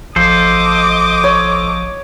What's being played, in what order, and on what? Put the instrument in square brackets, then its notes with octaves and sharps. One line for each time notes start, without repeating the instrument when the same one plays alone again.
[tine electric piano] A1 F3 F5 [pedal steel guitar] A4 C5 [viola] D#5 D6
[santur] C#5